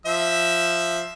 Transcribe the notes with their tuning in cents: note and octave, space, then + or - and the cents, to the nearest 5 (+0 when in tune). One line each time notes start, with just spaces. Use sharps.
F3 +0 E5 +0 E6 +0